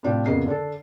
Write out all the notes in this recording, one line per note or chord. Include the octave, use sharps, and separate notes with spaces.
A2 C3 C4 D4 F4 G4
F2 C#3 A#3 B3 D#5 C7
D3 D4 A4